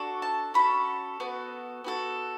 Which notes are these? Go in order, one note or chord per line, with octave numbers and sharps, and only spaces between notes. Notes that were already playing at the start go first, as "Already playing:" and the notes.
Already playing: D4 F#4 A4
A5
C#4 F#4 A4 B5
B3 F#4 A4
B3 F#4 A4